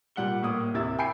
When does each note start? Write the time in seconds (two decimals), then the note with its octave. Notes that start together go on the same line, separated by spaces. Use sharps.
0.16 A#2 G3 F#5 C#7 G7
0.42 A2 A#3 D#6
0.74 D#2 C3 E4 E5 A6
0.99 G5 G#5 B5 G6 C7 D7